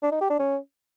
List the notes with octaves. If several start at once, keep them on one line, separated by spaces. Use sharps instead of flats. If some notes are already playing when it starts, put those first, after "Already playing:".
D4
D#4
G4
D4
C#4